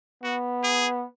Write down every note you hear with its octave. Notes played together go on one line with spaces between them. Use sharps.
B3 F#4
G#4